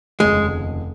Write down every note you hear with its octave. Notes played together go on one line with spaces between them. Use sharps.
F1 D#2 C#3 G#3